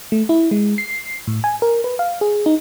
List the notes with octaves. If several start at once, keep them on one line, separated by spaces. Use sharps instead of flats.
A3
E4
G#3
C7
A2
G#5
A#4
B4
F5
G#4
D#4